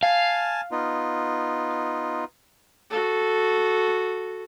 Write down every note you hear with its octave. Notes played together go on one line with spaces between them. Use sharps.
F5 G#5 A5
B3 D#4 F4
F#4 A4